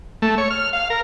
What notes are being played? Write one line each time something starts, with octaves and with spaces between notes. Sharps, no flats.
A3
C#5
F6
F5
A#4